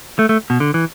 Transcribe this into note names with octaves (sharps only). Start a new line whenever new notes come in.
A3
A3
B2
D3
E3